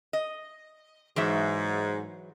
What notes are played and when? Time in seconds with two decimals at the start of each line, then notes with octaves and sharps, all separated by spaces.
0.13 D#5
1.16 G#2 E3 F#3 E5